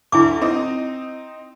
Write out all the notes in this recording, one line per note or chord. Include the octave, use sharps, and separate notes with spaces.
D2 D3 E4 G#5 D6
C4 D#4 D#5